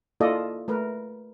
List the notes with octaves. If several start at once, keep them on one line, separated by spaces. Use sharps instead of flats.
A#3 E4 F4 A4 D5 D#5
A3 A#4 B4